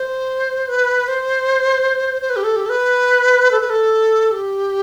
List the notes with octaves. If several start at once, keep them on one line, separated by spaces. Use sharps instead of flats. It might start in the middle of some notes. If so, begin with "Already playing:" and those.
Already playing: C5
B4
C5
C5
B4
G4
A4
G4
A4
B4
A4
B4
A4
G4